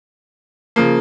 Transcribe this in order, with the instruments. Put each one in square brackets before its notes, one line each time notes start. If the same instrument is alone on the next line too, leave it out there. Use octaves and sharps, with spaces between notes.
[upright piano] C#3 F3 A#3